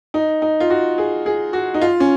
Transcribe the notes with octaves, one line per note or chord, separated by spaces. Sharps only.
D#4
D#4
F4
F#4
G#4
G#4
F#4
D#4
F4
C#4